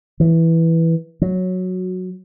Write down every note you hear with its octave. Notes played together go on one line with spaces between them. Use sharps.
E3
F#3